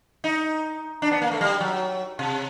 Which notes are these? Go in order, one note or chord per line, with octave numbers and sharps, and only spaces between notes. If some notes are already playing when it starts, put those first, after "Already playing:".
D#4
D4
B3
A#3
A3
G3
F#3
C3